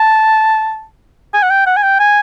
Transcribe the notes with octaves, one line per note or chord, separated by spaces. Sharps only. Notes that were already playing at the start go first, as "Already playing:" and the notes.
Already playing: A5
G#5
F#5
G5
F#5
G#5
G5
G#5